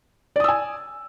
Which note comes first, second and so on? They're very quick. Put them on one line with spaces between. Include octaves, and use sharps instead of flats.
D5 D#6 E6 G#5